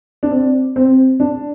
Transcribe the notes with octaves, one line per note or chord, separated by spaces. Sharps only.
D4
C4
C4
D4